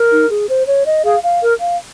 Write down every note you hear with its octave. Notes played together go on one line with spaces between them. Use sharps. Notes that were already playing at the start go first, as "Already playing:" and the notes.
Already playing: A#4
D#4
G#4
C5
C#5
D#5
G#4 F5
F5
A#4
F5